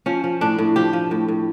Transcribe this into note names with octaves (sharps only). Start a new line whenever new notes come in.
F3 C#4
F3
A2 D4
A2
F3 G4
F3
A2
A2